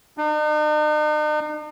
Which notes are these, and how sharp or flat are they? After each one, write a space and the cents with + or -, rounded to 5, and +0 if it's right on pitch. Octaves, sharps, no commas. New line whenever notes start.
D#4 -45